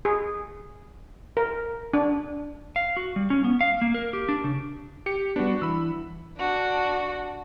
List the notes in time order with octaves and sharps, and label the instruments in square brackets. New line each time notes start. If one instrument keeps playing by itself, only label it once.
[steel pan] G#4
A#4
D4
[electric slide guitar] F5
F#4
G3
C#4
B3
F5
A#3
A#4
G4
D4
C#3
[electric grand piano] G4 C#7
[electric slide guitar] G3 B3 [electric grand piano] D4 F#4
[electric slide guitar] E3 [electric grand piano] B5 E6
[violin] D4 F#4